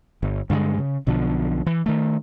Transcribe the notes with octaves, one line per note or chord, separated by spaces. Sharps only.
G1
G2 D3 D#3 G#3
C#3
B1 B2 D3 F3
E3
D#3 A3